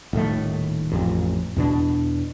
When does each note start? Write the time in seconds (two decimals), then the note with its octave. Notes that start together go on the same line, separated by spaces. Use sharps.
0.13 D#1 A2 D#3 A3
0.92 A1 F2
1.56 E2 B2 D4